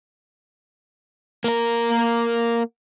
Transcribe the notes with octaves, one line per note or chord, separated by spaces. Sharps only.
A#3 A#4